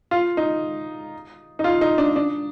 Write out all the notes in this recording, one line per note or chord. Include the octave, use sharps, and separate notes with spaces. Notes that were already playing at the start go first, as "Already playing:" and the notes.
F4
D#4
D#4
F4
D#4
D4
D4